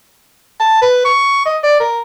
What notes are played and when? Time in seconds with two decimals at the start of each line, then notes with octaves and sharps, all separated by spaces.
0.60 A5
0.82 B4
1.05 C#6
1.46 D#5
1.63 D5
1.80 A#4